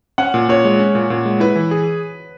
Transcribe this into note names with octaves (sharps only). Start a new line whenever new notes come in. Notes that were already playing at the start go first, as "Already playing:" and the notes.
C#4 F#5
A#2
A#2 C#5
G#3
C#4
A#2
A#2
G#3
E4 B4
E3
G#4